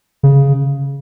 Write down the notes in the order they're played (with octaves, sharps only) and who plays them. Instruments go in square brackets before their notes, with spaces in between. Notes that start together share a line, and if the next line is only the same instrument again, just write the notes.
[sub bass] C#3